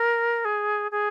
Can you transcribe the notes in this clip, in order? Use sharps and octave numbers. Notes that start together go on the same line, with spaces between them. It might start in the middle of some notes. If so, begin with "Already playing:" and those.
Already playing: A#4
G#4
G#4